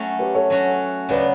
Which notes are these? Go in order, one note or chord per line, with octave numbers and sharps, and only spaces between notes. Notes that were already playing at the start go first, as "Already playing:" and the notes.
Already playing: F#3 A3 C#4
G4 B4
A4 C#5
F#3 A3 C#4 F#4
C#3 F#3 B3 B4 D5